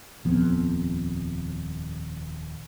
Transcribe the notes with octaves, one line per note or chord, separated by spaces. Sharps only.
D#1 F2 B3